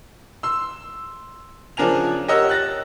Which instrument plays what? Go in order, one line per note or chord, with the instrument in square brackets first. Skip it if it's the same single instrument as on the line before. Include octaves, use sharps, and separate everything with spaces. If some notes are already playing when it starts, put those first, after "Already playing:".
[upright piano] C6 E6
C#3 F3 D4 A#4 G#5 F7
G4 A#4 C#5 D#5 F#5 E6
F#6 A6 A#6